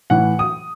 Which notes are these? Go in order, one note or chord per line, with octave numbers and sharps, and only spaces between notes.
A2 E3 F#5
D#6